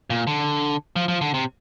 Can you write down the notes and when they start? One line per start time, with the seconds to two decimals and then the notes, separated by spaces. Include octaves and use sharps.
0.10 A#2
0.27 D3
0.96 F3
1.08 F3
1.21 D3
1.34 C3